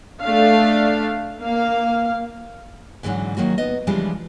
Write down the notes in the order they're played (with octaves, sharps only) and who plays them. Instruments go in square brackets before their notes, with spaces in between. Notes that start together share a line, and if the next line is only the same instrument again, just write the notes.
[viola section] A3 D4 F5
A#3 F5
[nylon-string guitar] G#2 D3 E3 F#3 C#4 D#4
D#3 F#3 A#3 F#4
B3 D#5
C#3 E3 F3 G3 G#3 D4